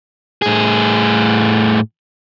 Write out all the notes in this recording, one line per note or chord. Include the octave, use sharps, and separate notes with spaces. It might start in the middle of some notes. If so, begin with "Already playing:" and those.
A2 G#4